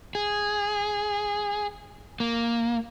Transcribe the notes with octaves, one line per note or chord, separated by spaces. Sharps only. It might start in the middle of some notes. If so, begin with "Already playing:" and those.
G#4
A#3